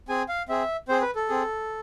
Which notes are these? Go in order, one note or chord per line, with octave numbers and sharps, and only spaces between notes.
C4 G#4 G#5
F5
C4 G#4 E5
C4 G#4 C5
B4
A4
C4 G#4